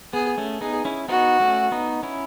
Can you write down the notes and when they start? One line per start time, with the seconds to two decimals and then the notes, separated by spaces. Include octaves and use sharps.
0.13 B3 G#4
0.38 A3 C#4
0.61 B3 D#4 G#4
0.85 C#4 E4
1.08 B3 D#4 F#4
1.40 A3 C#4
1.72 B3 D#4
2.03 C#4 E4